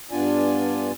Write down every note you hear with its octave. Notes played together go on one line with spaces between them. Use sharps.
G2 B3 D4 F4 D5 G#5